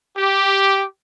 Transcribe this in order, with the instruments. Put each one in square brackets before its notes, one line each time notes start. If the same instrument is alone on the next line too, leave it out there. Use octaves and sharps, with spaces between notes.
[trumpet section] G4